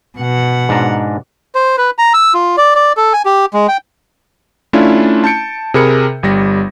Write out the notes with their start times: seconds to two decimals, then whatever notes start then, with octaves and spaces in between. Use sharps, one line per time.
0.18 B2 F#5
0.69 G#2 D4 A#5
1.55 C5
1.78 B4
1.98 A#5
2.14 E6
2.34 F4
2.57 D5
2.75 D5
2.97 A4
3.13 G#5
3.25 G4
3.53 G#3
3.68 G5
4.73 A3 C#4 D4 E4 F4
5.24 A5 G6 C#7 D7
5.74 C3 G#4 A#4 B5 C#7
6.23 G1 G3 A#6